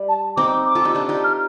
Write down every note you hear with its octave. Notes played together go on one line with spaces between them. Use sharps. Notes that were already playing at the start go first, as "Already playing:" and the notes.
Already playing: G3
A5
C4 D#4 D6
D6
F4 A4
D#4 G4
D4 F4
D#4 G4
F6